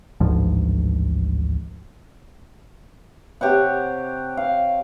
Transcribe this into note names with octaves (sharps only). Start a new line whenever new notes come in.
A1 D2 G#2 F3
C3 G4 C#5 F#5
F5